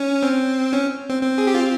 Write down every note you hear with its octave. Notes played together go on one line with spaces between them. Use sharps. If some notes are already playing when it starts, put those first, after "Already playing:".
Already playing: C#4
C4
C#4
C4
C4
G#4
G4
F4